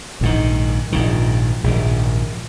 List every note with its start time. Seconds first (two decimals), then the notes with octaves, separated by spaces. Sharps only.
0.21 A#1 G#2 D#3
0.92 A#1 G#2 D#3
1.64 A#1 G#2 D#3